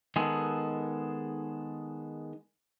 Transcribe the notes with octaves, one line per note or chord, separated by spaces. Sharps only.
D#3 G#3 B3 G#4 A4